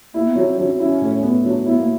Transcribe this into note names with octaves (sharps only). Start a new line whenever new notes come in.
A#3 E4
B3
F#3 C4
C4
F#3 D4
C#4
C4
C#4 E4
A2
B3
F#3 D4
B3 E4
A#3